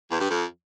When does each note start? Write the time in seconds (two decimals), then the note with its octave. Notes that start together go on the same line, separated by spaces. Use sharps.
0.11 E2
0.20 G2
0.29 F2